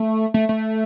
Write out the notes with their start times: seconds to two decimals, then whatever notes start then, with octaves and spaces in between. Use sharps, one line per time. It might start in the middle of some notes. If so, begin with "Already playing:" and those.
Already playing: A3
0.34 A3
0.49 A3